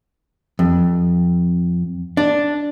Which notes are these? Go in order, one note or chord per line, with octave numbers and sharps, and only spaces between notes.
F2
D4